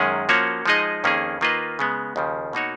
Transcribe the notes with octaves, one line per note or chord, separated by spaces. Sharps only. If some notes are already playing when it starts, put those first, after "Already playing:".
Already playing: F#2 D#3 G#3 C#4 G#4
F3 A#3 C#4 F#4 C#5
F3 G#3 D#4 G#4 D#5
F2 D#3 A#3 C#4 G#4
D#3 A#3 F4 B4 D#5
C#3 G#3 B3
D#2 C#3 F3
B2 A#3 D#4 F#4 C#5